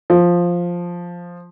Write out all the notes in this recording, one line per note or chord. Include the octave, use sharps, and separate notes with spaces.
F3